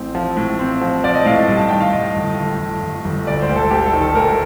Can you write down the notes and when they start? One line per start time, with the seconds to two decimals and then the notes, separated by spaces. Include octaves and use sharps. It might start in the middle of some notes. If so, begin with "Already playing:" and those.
Already playing: A1 C4
0.15 F3
0.37 A2
0.59 C4
0.81 F3
1.04 F3 D5
1.14 D#5
1.26 A2 F5
1.37 D#5
1.48 G2
1.57 A5
1.69 D#3 G5
1.80 F5
1.93 G2 D#5
2.16 G1
2.37 A3
2.60 G1
2.82 G1
3.05 G1
3.27 D2 D5
3.42 C5
3.49 D2
3.56 A4
3.71 D2 G4
3.86 A4
3.93 D#3
4.01 A4
4.15 D2 A#4